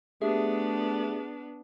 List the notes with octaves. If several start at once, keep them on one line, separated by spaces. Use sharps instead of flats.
A3 B3 D4 G4 G#4 E5